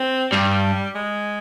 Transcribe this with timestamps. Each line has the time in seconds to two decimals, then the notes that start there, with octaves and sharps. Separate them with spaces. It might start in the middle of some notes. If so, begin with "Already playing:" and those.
Already playing: C4
0.32 G2 G3
0.95 G#3